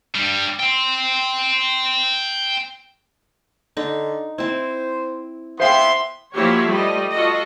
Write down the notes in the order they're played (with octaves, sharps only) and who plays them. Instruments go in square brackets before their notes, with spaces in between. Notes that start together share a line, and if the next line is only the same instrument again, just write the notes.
[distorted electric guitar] G2 G3
G5 C6
[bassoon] D3 [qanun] D#4
[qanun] C4 E4 [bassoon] C5
[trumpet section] B3 E5 C6 [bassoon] E4 [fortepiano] C5 F5 G5
[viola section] F3 F#3 A#3 E4 G4 C#5
G3 A3 D5 D#5
F4 F#4 A4 D#5